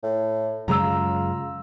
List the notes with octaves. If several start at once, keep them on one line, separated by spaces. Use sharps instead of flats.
A2
F#2 C#3 G#3 A#5 E6
F4